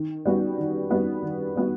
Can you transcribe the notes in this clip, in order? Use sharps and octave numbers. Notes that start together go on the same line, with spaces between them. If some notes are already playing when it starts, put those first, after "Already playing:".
Already playing: D#3
G3 B3 F#4
D#3
G3 B3 F#4
D#3
G3 B3 F#4